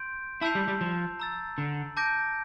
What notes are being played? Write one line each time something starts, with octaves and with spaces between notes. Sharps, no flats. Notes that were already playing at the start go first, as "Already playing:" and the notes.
Already playing: C6 G6 D7
E4 A5 E6 G6 C7 F7
G3
G3
F3
A#5 E6 A6
D3
A5 D6 G6 A#6 D7